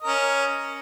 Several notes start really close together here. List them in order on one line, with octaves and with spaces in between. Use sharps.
D#5 A#4 C#4